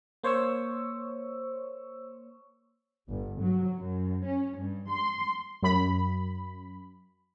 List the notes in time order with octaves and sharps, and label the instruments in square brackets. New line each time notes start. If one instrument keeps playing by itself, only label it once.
[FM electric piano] A#3 C5 C#5 C#6 E6
[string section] G1
F#3
F#2
C#4
G2
C6
[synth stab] F#2 B5